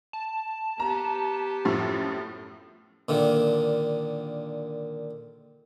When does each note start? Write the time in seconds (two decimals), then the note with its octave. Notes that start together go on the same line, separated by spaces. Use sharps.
0.13 A5
0.80 B3 G4 A#5
1.65 F#2 A2 F3
3.09 A#2 D3 D#3